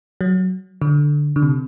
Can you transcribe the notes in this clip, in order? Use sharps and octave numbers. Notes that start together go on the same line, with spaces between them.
F#3
D3
D3
C3